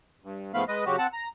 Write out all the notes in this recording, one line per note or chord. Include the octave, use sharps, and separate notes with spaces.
G2
G#2 F3 A3 B3 F5 B5
G#3 B4 D#5
C#3 F#3 F#4 G4
C4 F#5 A5
A#5